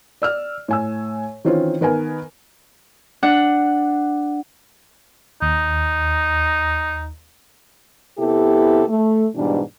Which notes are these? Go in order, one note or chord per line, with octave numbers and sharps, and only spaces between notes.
D5 E6 F6
A2 G#5 E6
D#3 E3 C4 C#4 F4
D#3 B3 A#4 G#5
D4 F#5
D#2 D#4
C3 B3 E4 G4 A4
A3
G#2 B2 E3 G3 D4